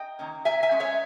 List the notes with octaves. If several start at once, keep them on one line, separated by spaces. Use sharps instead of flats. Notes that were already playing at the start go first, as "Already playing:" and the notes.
Already playing: D#5 G5
D#3 A#3 C#4
A#2 E5 G#5
E5 G#5
G#3 C#4
C#5 E5